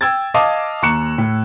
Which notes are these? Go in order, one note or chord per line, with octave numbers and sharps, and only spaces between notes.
G5 E6 G#6 A6
D#5 F5 A5 D6 D#6
D#2 A#5 C#6 F#6 C#7 E7
A2